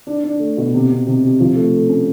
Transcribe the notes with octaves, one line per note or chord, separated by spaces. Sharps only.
D4
D4
A3
B2
C3
C3
C3
C3
F3
A3
A3
C#4